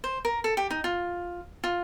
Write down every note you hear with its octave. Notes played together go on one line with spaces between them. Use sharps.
C5
A#4
A4
G4
D#4
F4
F4